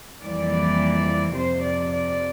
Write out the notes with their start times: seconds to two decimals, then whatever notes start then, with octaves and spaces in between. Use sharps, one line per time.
0.23 F2 E3 G3 A#3 D5
1.36 F2 C3 F3 C5
1.64 D5
1.93 D5